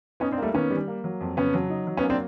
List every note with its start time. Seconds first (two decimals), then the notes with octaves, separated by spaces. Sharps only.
0.20 B3 C#4 D#4
0.31 C4 D4
0.38 G3 A3 A#3
0.54 D#3 B3 C#4
0.70 G3
0.88 A#3
1.04 F#3
1.21 F2
1.37 C#3 B3 C#4
1.54 F#3
1.70 D#4
1.87 F#3
1.97 B3 C#4
2.03 A#3
2.10 C4 D4